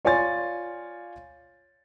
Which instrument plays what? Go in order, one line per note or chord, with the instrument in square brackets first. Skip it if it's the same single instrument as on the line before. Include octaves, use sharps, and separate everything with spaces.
[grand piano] F4 C#5 D5 G#5 C6 A6